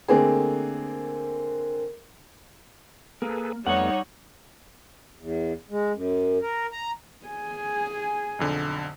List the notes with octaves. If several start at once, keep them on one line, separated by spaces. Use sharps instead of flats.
D3 A3 A#3 C4 G#4
A#3 G#4 A4 B4
F2 G3 A3 B3 D#4 C#5 F#5
E2
G#3
F#2
A#4
A#5
G#4 G#5
B1 F2 D3